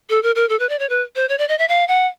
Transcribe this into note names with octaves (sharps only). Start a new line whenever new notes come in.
A4
A#4
A#4
A4
B4
D5
C#5
B4
C5
C#5
D5
D#5
E5
F5
F#5